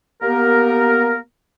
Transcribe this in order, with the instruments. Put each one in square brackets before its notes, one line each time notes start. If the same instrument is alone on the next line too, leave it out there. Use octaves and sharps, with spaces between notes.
[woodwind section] A#3 B3 G4 A#4